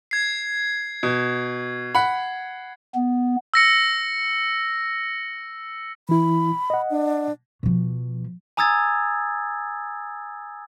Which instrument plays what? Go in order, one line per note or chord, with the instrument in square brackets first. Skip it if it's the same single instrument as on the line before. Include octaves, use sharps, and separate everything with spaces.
[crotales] G#6 C7
[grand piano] B2
F#5 B5
[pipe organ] B3
[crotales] E6 A#6 C#7
[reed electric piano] E3 E4 [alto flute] B5
[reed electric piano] D#5 F#5
[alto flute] D4
[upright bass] B2 F3
[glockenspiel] G#5 A#5 D#6 E6 G#6 A6